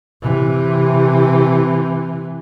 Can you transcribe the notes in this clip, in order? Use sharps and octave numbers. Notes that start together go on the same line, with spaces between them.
C3 E3